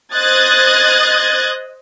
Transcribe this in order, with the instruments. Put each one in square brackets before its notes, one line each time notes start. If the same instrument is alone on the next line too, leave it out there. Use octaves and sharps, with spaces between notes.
[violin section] C5 D#5 D#6 F#6 G#6 A6